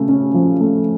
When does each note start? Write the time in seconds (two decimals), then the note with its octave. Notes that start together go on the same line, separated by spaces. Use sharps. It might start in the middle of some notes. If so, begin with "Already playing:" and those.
Already playing: C#3 A3
0.09 C#4
0.34 F3
0.61 A3